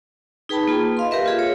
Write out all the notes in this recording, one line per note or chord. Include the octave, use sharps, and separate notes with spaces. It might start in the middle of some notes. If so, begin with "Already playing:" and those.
D#4 G#4 B4 G5 A5 B5
A#3 F4 G#4
D#5 F5 C6
G4 A#4 B4 E5
F4 G#4
C#5